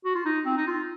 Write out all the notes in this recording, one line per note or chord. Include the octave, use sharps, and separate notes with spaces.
F#4
F4
D#4
C4
D#4
F4